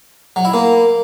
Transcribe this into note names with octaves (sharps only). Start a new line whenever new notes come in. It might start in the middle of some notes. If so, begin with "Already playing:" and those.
F#3
E4
A#3